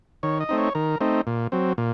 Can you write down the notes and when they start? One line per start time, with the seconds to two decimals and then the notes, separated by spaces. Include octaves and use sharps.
0.23 D#3 C#5
0.40 D#5
0.49 A3 C4 D#4
0.58 C#5
0.75 D#3 A#4
1.01 A3 C4 D#4
1.27 A#2
1.52 F#3 C4
1.78 A#2